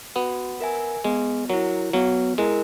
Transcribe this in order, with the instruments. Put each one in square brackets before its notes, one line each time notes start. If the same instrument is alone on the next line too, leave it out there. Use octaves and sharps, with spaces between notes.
[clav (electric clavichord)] B3 [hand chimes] F#4
[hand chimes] A#4 E5 G#5
[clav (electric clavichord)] G#3 [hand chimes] B3
[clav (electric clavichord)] F#3 [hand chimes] E4 A#4
[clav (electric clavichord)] F#3 [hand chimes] B3
[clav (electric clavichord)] G#3 [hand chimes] E4 A#4